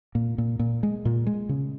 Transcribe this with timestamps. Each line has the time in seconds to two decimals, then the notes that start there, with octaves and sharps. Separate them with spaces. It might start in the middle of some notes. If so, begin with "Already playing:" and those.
0.15 A#2
0.38 A#2
0.59 A#2
0.83 G#3
1.05 A#2
1.27 G#3
1.49 C#3